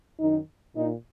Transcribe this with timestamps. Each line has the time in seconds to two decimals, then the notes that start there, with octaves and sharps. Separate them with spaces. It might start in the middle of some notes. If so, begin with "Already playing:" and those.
0.20 F#2 D#3 D#4
0.76 A#2 D#4